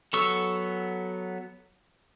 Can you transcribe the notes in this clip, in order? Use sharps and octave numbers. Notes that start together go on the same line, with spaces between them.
F#3 B3 A4 C#6 E6